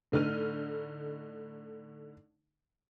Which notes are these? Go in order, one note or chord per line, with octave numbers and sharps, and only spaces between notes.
A2 D3 D#4 F6 D#7